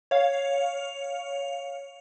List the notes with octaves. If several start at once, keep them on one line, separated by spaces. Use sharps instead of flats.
C#5 F5